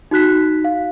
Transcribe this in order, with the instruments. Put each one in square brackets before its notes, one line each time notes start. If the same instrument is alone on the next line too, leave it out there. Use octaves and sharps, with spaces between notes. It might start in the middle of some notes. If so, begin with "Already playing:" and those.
[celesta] D#4 F#4 F#6 B6
F5